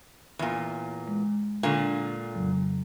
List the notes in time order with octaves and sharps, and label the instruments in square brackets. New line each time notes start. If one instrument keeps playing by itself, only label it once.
[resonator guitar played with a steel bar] E2 A#2
[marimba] G#3
[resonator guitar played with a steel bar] A#2 D3
[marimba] F2 C#3 F#3